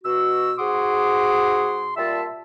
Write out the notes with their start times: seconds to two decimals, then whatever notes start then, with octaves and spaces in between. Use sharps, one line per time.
0.04 B2 F#4 E6
0.59 G#2 F#4 G#4 C6 D6 D#6
1.97 A#2 G3 F4 E5 A5